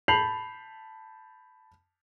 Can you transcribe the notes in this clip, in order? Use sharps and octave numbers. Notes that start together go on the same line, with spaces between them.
A5 B5 G6 C7 F7 F#7